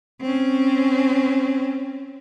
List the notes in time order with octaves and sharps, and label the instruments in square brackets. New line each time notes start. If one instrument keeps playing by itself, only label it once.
[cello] C4 C#4